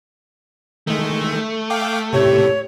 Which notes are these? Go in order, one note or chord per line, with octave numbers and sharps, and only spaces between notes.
D#3 G#3 A3
F5 G5 D6
A2 C3 G4 C#5